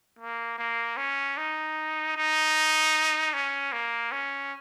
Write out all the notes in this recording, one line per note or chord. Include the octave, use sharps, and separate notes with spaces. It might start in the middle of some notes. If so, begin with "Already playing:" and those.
A#3
A#3
C#4
D#4
D#4
C#4
A#3
C#4